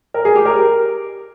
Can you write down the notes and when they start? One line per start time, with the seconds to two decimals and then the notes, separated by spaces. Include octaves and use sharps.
0.14 A#4
0.25 G#4
0.36 G4
0.45 A#4